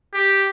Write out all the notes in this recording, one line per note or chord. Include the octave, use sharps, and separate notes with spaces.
G4